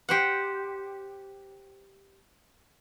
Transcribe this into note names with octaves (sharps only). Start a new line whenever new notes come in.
G4 C5 F#5